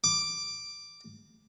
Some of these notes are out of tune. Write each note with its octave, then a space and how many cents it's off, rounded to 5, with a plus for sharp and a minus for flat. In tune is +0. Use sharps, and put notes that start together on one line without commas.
D6 +5